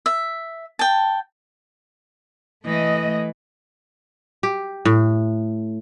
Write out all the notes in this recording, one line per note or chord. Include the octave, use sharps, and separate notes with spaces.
E5
G5 A5
E3 A3 D#5
G4
A2